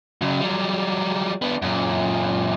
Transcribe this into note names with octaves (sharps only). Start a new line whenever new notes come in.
C#3 F#3
F#3 G3
B3 D4
F#2 A#2